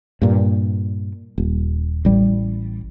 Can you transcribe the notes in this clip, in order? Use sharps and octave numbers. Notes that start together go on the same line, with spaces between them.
G2 A#2
D#1
A1 G3